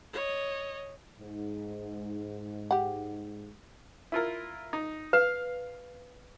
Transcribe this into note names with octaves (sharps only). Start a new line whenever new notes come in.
C#5 D#5
G#2
G4 F#5
E4 F4 A#4
D#4
B4 F5